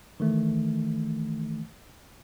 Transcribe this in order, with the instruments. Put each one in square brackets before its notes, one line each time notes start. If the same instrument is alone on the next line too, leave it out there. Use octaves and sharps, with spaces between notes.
[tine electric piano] D#3 E3 A3